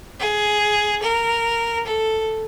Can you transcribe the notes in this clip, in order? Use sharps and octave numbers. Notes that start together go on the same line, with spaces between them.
G#4
A#4
A4